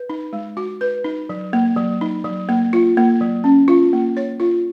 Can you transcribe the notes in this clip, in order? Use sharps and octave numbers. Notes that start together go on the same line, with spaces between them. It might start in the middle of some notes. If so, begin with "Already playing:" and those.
Already playing: B4
D#4
G#3
F#4
B4
D#4
F#3
A#3
F#3
D#4
F#3
A#3
F4
A#3
F#3
C#4
F4
A#3
C#5
F4